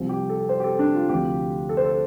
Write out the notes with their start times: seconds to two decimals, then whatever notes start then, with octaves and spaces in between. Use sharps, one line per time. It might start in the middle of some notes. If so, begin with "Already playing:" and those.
Already playing: C2 C3 F3 C4
0.09 G4
0.29 A4
0.49 C5
0.60 G4
0.64 A4
0.79 D4
0.95 F4
1.09 D2 C3 F3 C4 G4
1.69 A4
1.77 C5
1.85 A4